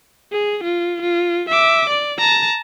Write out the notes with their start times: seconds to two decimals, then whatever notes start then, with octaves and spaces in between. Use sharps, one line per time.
0.32 G#4
0.64 F4
1.02 F4
1.49 E5 D6
1.89 D5
2.18 A5 A#5